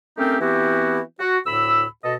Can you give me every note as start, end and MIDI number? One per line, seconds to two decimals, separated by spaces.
0.18 0.37 57
0.18 0.37 60
0.18 0.37 61
0.18 0.37 63
0.18 0.37 67
0.18 0.37 70
0.41 1.00 52
0.41 1.00 59
0.41 1.00 60
0.41 1.00 64
0.41 1.00 66
0.41 1.00 67
1.19 1.38 66
1.46 1.85 38
1.46 1.85 45
1.46 1.85 83
1.46 1.85 88
2.04 2.15 47
2.04 2.15 69
2.04 2.15 75